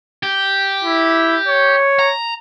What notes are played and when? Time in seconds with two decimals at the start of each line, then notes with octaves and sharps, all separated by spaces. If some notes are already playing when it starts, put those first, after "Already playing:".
0.23 G4
0.84 E4
1.48 C#5
1.99 A#5